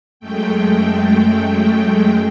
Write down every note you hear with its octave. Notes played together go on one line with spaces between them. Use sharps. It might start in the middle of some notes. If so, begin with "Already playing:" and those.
F#2 G#3 A3 G5